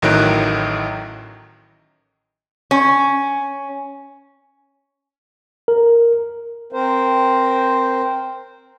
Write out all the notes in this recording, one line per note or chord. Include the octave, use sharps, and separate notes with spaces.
A1 A2 D#3 F#3 F#6 D7
C#4
A#4
C4 A#4 C5